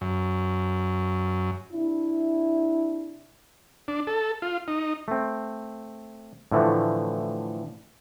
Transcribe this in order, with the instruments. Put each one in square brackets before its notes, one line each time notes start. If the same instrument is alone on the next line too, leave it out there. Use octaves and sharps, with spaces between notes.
[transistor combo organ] F#2
[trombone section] C3 D4 E4
[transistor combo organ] D4
A4
F4
D#4
[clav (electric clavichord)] A3 C4
A2 D3 E3 F3 A3